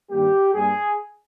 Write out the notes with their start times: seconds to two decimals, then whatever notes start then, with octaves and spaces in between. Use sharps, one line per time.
0.10 G2 D#3 G3 A#3 G4
0.53 G2 G3 A#3 G#4